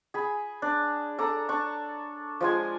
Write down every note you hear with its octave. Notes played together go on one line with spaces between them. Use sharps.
G#4 B5
D4
A4 D5 A#5
D4 C#6
F3 G#3 G#5